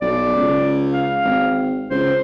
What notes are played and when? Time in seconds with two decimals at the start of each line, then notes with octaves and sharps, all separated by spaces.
0.01 B1 D5
0.36 C#2
0.93 F5
1.25 G#1
1.90 C#2 C5